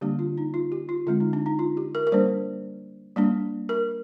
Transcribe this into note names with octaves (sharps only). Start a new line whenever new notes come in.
D3 G3 A#3 D4 G4
F4
D#4
F4
G4
F4
D3 G#3 C4 F4
D#4
D4
D#4
F4
G4
A#4
A#4
G3 A#3 D4 C5
G3 A#3 D4
A#4